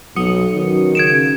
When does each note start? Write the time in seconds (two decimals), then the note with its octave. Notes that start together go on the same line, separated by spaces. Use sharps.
0.16 B1 F#3 D#6 C#7
0.55 D#3 B3 C#4 F#4
0.95 C#3 G#6 D7 E7